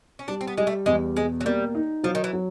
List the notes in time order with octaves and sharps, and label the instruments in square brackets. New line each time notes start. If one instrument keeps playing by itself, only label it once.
[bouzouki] C#4
[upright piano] G3 [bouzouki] D4
[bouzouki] C4
B3
[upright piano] G3 [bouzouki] G#3
[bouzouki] A3
[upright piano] E2 [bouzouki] G#3
[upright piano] B2 [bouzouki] G#3
[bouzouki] F#3
[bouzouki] G3 [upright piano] A#3
[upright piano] D#4
[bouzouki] F3 [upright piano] F#3
[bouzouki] D#3
E3
[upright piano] F#3